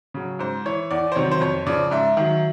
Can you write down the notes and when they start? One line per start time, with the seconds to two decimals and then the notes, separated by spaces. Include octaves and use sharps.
0.14 C#3 F#3
0.39 G#2 C5
0.65 E3 C#5
0.91 E2 D5
1.12 C5
1.16 C3 D#3 F#3 C#5
1.32 C5
1.41 F2 C#5
1.67 C#3 F3 D5
1.91 G#2 E5
2.17 D#3 F#3